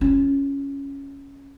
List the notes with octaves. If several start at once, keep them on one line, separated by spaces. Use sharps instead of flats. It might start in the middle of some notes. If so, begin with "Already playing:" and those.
C#4 F4